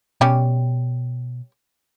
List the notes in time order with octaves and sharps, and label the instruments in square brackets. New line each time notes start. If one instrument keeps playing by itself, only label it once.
[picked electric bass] B2 [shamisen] G3 C#4 G4